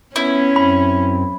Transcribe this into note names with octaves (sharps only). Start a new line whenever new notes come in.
B3 C#4 E4
F#2 C4 B5